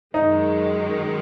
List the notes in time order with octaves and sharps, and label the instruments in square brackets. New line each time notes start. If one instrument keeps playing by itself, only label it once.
[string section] F#2 D#3 G#3 [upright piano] D#4